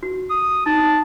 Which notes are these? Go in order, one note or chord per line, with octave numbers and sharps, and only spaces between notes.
F#4
D#6
D#4 A5